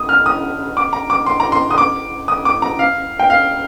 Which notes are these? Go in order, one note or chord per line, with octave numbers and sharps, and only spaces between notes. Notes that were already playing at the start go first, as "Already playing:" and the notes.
Already playing: D#6
F6
D#6
D6
A#5
D6
C6
A#5
C6
D#6
D6
D#6
D6
A#5
F5
G5
F5